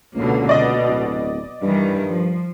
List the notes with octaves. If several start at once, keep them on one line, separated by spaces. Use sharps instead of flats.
C#2 B2 D3 A#3
B2 D5 D#5
D1
G2 D#3 E3 G3
F3